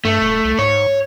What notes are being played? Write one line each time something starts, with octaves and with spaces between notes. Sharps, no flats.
G2 A3
D#1
C2
G#2 C#5